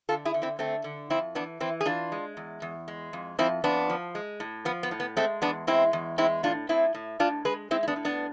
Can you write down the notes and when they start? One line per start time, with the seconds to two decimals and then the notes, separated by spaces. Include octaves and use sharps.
0.09 D3 F4 A4
0.25 E4 G#4
0.34 D3
0.42 C4 E4
0.59 D3 A3 C4
0.84 D3
1.10 F2 C4 E4
1.35 E3 B3 D4
1.60 E3 C4 E4
1.81 G#4
1.86 E3 D4 F4
2.12 G#3
2.37 E2
2.62 E2
2.88 G#3
3.13 F2
3.39 F2 C4 E4
3.64 F2 B3 D4
3.89 F3
4.15 G#3
4.40 A2
4.65 F3 B3
4.83 B3
4.91 A2
5.00 B3
5.17 G#3 A3 C4
5.42 E2 B3 D4
5.67 G#3 C4 E4
5.93 E2
6.18 G#3 C4 E4
6.43 A2 D4 F4
6.69 A2 C4 E4
6.95 A2
7.19 A2 D4 F4
7.45 G#3 G#4 B4
7.71 G#3 C4 E4
7.83 E4
7.88 B3 D4
7.96 A2
8.05 B3 D4